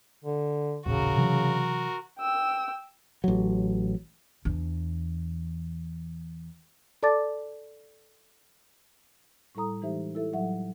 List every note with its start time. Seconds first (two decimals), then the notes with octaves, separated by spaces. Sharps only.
0.24 D3
0.86 D#1 A1 C#3 F#4 A#4
1.16 C3 E3 F#3
2.19 G5 E6
3.24 A1 F#3
4.45 E2 D4
7.03 A4 D5 A5 D6 A6
9.55 A2 G3 E4 A4 A#5 D#6
9.82 E3 G#3 D#4 G4 C5 E5
10.15 E4 A4 E5
10.33 A2 F#3 G3 A4 E5 F#5